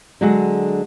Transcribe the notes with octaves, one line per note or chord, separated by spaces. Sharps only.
D3 F#3 G#3 F#4 G#4